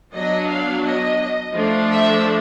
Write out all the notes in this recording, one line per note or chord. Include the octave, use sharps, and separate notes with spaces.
F#3 B3 D4 D#5
F5
D#5
F3 A3 D4
E5